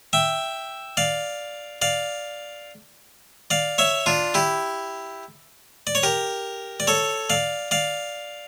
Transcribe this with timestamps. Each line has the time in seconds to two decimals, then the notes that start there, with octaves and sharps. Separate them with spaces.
0.13 E5 G5
0.97 D5 F5
1.82 D5 F5
3.50 D5 F5
3.78 C#5 E5
4.06 D4 F4
4.34 E4 G4
5.87 D5
5.95 C#5
6.03 G4 A#4
6.80 D5
6.87 A4 C#5
7.30 D5 F5
7.71 D5 F5